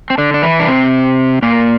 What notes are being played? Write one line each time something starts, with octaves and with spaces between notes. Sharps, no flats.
C4
D3 D4
D4
E3 E4
D4
C3 C4
A#2 A#3